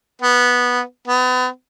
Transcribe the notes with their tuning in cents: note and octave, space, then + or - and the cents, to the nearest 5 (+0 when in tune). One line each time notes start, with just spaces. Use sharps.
B3 -10
B3 +35